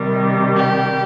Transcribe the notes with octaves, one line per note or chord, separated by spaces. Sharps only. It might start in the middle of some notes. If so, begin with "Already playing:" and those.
Already playing: C3 D#3 G3
G4